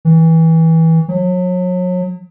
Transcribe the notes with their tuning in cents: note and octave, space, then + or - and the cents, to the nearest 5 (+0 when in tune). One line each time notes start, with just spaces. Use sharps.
E3 -20
F#3 -35